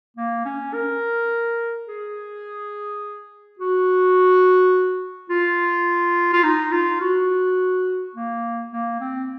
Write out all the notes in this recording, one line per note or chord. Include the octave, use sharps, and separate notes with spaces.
A#3
C#4
A#4
G#4
F#4
F4
F4
D#4
F4
F#4
A#3
A#3
C4